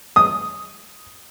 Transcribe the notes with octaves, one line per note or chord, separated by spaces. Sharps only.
D#6